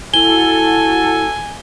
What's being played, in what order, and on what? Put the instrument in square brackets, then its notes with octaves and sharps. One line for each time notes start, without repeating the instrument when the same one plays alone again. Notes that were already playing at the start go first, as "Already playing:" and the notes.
[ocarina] E4 [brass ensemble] F#4 A4 [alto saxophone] G#5 [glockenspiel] G7